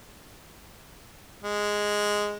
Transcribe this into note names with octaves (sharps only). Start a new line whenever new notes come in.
G#3